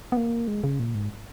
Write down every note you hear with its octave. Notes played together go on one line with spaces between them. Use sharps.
B3
A#3
G#3
C#3
A#2
G#2